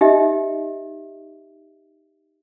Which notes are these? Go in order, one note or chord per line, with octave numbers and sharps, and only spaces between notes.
D#4 G4 D#5 E5